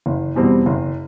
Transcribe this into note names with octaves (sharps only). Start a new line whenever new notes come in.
F#1
E2 B2 G3 C4
F#1